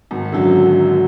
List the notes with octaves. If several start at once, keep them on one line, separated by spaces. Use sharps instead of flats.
G#1
F#2 D3 F#3